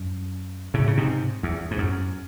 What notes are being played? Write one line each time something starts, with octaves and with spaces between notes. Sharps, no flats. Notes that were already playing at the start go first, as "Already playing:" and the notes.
Already playing: F#2
A2 C#3
C#3
G#2 C3
E2
G#2
F#2